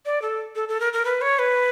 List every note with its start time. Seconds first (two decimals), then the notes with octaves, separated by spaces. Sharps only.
0.06 D5
0.22 A4
0.55 A4
0.69 A4
0.80 A#4
0.93 A#4
1.05 B4
1.21 C#5
1.39 B4